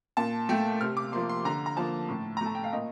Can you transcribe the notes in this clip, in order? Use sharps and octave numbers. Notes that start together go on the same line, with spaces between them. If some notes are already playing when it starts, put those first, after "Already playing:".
A#2 A5
A3 G5
C3 F6
D6
F3 A#3 C6
C6
D3 A#5
A#5
F3 A#3 A5
A2
A#5
A3
A5
G5
F5
A#2 D#5